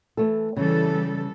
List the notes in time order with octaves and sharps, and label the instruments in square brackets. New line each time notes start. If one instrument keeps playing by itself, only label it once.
[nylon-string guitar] E3 A3 A4
[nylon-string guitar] C#3 [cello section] E3 G3 A4